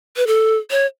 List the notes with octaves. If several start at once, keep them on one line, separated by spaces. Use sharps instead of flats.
B4
A4
C#5